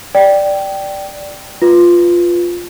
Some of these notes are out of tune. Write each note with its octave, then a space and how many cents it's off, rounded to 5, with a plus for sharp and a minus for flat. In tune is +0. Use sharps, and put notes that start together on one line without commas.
D5 +0 G5 -10
F4 +0 B4 +0